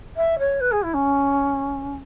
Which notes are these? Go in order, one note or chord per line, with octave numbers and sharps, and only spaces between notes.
E5
C#5
B4
G#4
E4
C#4